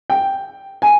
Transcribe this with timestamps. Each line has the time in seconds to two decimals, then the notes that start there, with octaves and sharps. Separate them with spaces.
0.10 G5
0.82 G#5